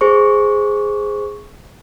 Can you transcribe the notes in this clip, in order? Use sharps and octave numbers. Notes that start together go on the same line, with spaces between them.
G#4 C5 C#6